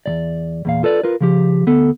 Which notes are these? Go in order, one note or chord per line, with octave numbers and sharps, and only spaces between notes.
E2 A#2 D5
E2 A#2 F5
F4 A4 B4 D5
F4 A#4 B4
C#3 F3 G4
D2 B3 A4